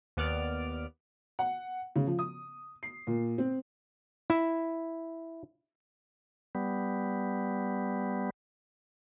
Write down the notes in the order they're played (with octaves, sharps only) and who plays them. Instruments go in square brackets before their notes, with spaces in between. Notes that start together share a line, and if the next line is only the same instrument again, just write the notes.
[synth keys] D#2 B3 D5 F6 D7
[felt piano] F#5
C#3
F3
D#6
C7
A#2
C4
[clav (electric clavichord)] E4 E5
[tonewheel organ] G3 B3